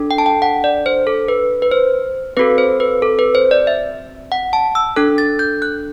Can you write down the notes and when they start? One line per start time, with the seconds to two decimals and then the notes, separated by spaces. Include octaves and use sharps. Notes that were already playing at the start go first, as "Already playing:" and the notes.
Already playing: D4 A4
0.11 G5
0.18 A5
0.26 G5
0.42 F#5
0.64 D5
0.86 C5
1.07 A4
1.28 B4
1.62 B4
1.72 C5
2.37 C4 F#4 A4 B4
2.58 C5
2.80 B4
3.02 A4
3.19 B4
3.35 C5
3.51 D5
3.67 E5
4.32 F#5
4.53 A5
4.75 E6
4.96 D4 A4 F#6
5.18 A6
5.39 G6
5.62 F#6